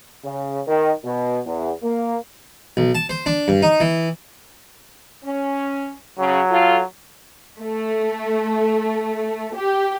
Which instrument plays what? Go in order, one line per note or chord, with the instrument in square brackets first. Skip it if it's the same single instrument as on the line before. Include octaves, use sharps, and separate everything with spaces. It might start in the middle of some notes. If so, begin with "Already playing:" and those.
[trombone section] C#3
D#3
B2
E2
A#3
[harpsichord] B1
A5
C5
D4
G2
D#4
E3
[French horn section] C#4
[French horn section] C#3 [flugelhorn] F#3
[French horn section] F4 A4
[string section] A3
G4